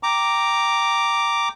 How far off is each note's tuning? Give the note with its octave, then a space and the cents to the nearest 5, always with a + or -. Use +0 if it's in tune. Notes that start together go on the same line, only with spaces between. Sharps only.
G5 +0 A#5 +0 D6 +0